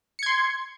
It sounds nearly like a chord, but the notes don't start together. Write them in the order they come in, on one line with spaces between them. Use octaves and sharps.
C#7 G#6 C6